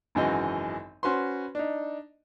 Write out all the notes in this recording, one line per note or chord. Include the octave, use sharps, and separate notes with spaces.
G#1 F#2 C#3 E3 F#4 D#5
C#4 F#4 B4 C5 C6
D4 D#4